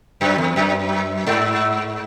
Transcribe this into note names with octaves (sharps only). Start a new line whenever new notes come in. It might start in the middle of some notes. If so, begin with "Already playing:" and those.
F#2
E2
F#2
G#2